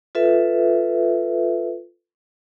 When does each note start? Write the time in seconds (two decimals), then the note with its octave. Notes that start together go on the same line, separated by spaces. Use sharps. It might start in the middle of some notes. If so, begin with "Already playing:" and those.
0.15 F4 A4 B4 E5